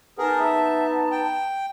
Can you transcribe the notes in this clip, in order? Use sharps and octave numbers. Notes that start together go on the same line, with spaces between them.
B3 D#4 G#4 A#4 A5
E5
G5